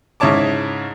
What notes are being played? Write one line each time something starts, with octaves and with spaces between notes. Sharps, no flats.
G#2 C#3 E4 C#5 A5 D6